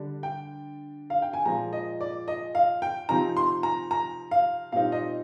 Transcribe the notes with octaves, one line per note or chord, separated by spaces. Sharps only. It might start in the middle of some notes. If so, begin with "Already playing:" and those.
Already playing: D3 G3 D4
G5
F5
G5
G#5
A#2 F3 G#3 A#5
D#5
D5
D#5
F5
G5
C3 F3 C4 D#4 A#5
C6
A#5
A#5
F5
A#2 G3 C4 D#4 F5
D#5